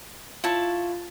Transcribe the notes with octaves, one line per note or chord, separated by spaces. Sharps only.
E4 F4 C#5 F5 A5